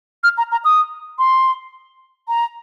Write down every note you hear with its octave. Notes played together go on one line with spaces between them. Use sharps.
F6
A#5
A#5
D#6
C6
A#5